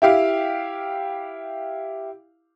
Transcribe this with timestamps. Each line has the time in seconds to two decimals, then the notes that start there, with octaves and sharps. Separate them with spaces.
0.02 E4 G4 F5